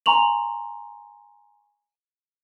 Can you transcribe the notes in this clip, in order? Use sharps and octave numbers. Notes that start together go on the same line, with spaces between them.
G#5 A#5 C6 C#6 F7 F#7